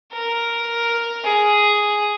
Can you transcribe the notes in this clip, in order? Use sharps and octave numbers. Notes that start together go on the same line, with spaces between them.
A#4
G#4